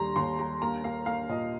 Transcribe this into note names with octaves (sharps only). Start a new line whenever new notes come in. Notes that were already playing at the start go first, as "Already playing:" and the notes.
Already playing: D#2 G3 A#5 C6
D#2 C6
G3 A#5
A#3 A#5
A#3 F5
A#3 F5
A#2 D#5